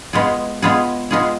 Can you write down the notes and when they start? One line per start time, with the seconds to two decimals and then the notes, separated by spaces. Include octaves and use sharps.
0.13 G#3 B3 F4 G#4
0.62 G#3 B3 F4 G#4
1.11 G#3 B3 F4 G#4